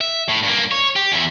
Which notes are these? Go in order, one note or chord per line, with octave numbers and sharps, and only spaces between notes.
E5
A2
G2 A#3
C#5
G4
E2 E4